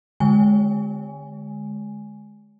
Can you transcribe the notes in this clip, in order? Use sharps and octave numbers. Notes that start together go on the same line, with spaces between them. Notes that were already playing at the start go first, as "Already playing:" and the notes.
D3 G#3 G#5